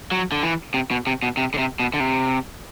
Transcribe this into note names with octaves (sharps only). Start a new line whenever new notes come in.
F#3
D3
E3
C3
B2
C3
B2
C3
D3
C3
B2
D3
C3